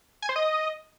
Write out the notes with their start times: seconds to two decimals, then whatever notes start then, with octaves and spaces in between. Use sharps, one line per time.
0.22 G#5
0.29 C5
0.36 D#5